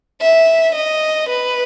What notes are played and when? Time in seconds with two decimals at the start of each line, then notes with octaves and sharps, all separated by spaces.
0.21 E5
0.75 D#5
1.29 B4